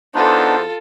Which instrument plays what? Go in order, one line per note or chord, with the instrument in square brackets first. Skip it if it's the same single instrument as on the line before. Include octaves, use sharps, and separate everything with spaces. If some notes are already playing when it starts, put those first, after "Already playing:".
[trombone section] E2 C5 [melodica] B3 D4 D#4 [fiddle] F4 A4